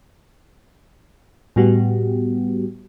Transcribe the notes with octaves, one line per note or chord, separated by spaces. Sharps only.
A2 G3 B3 F#4 G4